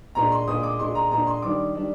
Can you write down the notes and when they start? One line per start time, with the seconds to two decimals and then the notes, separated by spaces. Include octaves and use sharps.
0.15 A#2 G#3 D4 A#5
0.32 C6
0.47 A#2 G#3 D4 D#6
0.63 D6
0.79 A#2 G#3 D4 C6
0.95 A#5
1.11 A#2 G#3 D4 A#5
1.27 C6
1.42 D#3 G3 D4 D6
1.75 D#3 G3 D4